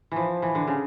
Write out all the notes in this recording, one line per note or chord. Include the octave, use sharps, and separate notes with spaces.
E3 F3
E3
D3
C#3